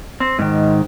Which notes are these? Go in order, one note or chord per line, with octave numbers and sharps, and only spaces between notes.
C4
G#2 D#3